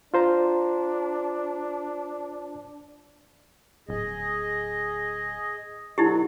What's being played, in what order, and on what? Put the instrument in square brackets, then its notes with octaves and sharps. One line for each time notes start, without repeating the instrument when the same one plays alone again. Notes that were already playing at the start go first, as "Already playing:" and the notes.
[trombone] D4 [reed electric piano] F4 C5 A#5
[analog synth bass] D1 [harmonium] G#4 D#5
[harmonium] B2 D3 F#3 [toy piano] D#4 E4 G4